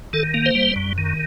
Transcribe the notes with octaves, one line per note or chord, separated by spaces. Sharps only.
D#3 A4
A#3
C5
G3
F#2
D#3